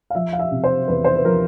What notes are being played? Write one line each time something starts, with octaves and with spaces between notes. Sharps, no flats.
F5
F3 E5
F5
E5
C3
C5
E2 B4
C5
B4
F3 A#4